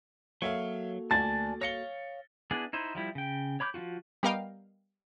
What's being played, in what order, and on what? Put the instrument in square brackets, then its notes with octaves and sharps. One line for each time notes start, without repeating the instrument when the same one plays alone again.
[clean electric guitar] F#3 [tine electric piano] A#3 F#4 A4 [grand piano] C#5 E5 F5
[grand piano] D2 [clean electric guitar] D5 G#5 A5 [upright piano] A6
[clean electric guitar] C#5 F5 [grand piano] A#6 C#7 G7
[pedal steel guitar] B3 D4 E4 G#4 D5
D#4 E4 C5
F3 G3 E4
C#3 G5
C#5 B5 D6 F#6 G6
F3 D4 F4 F#4
[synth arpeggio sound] G3 B3 A#4 D#5 F5 G5